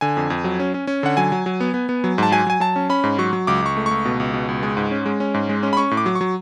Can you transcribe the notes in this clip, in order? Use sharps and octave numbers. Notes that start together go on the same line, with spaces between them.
D3 G#5
F2
F2
F#3
C#4
C#4
C#4
D3 F#5
F#3 G#5
F#3
F#3
B3
B3
B3
F#3
G#2 A5
F#3 G#5
F#3 G#5
F#3 A5
C#4
C#4 B5
G#2
F#3 C#6
F#3
C#2 D6
C#2 C#6
A3
C#2 C#6
B2
C#2
B2
C#2
G#3
G#2
C#4
G#3
C#4
G#2
G#3
C#4
B5
C#4 C#6
A2
D6
F#3
C#6
F#3